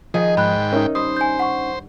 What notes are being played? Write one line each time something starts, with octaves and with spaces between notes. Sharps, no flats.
D#3 F3 G#4 D#5
G#2 G5 B5 F#6
C#4 D#4 A#4 C#5 E5
G2 C5 D#6
G#5 G6
F#5 C6 C#6